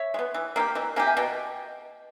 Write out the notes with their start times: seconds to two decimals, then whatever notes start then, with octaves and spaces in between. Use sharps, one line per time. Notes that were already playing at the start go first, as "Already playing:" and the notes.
Already playing: C#5 E5
0.14 G#3
0.19 B3
0.34 E3
0.56 A#3 E4
0.60 G4
0.75 E3 B4 D#5
0.96 A#3 E4 G4 E5 G#5
1.07 E5 G#5
1.17 B2 D#5 G5